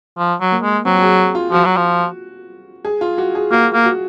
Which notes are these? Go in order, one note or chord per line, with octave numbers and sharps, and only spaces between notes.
F3
F#3
A#3
G#3
F#3 C4
F#4
G#4
F4
F3 F#4
F#3
F3
G#4
F4
F#4
G#4
A#3 F#4
A#3
F#4